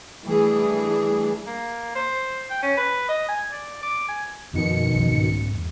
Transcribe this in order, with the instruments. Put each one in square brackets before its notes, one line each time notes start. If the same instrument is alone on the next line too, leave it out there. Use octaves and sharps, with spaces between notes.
[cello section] E3 G3 A3 D4 G#4
[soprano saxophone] A#3
C5
G5
C#4
B4
D#5
G#5
D5
D6
G#5
[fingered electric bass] F#2 F3 [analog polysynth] B2 D#3 C#7
[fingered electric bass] B1 F2 F3
C2 G#2
E1